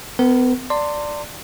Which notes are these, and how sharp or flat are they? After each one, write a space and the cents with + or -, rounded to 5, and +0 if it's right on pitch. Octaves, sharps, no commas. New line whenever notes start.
B3 +35 A#4 +0
D5 +0 A5 +45 C6 -5